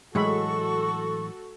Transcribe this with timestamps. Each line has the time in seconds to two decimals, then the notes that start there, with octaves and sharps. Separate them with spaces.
0.15 A2 E3 F#3 G#3 F#4 A4 B5 C#6